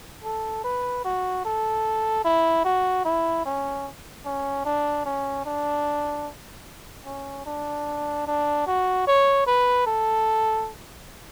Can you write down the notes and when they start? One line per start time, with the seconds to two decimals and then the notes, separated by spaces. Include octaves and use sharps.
0.24 A4
0.64 B4
1.05 F#4
1.45 A4
2.25 E4
2.65 F#4
3.05 E4
3.46 C#4
4.25 C#4
4.65 D4
5.06 C#4
5.45 D4
7.06 C#4
7.46 D4
8.27 D4
8.67 F#4
9.07 C#5
9.47 B4
9.87 A4